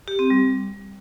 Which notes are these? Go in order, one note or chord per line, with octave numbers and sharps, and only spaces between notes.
G4
C4
G3